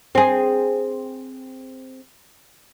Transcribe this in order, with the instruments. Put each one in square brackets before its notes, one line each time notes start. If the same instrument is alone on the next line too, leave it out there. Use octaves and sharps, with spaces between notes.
[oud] C4 G#4